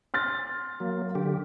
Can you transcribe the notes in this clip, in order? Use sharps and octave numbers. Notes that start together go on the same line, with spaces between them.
C6 F6 A6
F#3 A#3
D3 G4